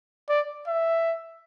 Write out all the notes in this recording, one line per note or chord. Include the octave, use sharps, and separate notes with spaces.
D5
E5